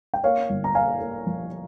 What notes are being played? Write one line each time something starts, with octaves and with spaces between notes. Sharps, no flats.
G5
A#3 C#5 F5
G1
A#5
A#3 F5 G#5
A#3
F3